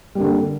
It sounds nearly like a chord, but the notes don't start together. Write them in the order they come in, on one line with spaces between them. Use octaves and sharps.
G3 A#3 D3